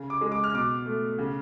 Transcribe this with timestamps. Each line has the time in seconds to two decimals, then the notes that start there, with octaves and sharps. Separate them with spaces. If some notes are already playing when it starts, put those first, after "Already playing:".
Already playing: C#3
0.10 D6
0.21 G#3
0.32 D6
0.44 F6
0.53 B2 D6
0.86 A3
1.19 C#3